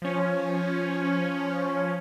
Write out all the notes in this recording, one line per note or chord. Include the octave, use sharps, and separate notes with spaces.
F3 C#4